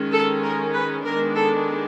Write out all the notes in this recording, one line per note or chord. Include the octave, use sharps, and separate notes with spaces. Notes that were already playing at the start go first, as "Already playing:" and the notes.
Already playing: D#3 G#3 C#4
A4
A#4
B4
D#3 G#3 B3 D4 A#4
A4